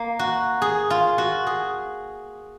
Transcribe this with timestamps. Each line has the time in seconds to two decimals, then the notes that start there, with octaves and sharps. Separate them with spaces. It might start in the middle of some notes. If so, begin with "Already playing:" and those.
Already playing: A#3
0.19 F#4
0.62 G#4
0.90 F4
1.18 F#4
1.47 G#4